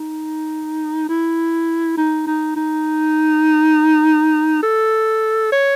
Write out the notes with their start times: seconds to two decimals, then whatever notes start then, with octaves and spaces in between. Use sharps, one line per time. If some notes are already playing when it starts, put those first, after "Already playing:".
Already playing: D#4
1.09 E4
1.97 D#4
2.26 D#4
2.56 D#4
4.63 A4
5.52 C#5